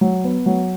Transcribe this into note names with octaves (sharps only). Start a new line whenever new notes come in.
F#3
B3
F#3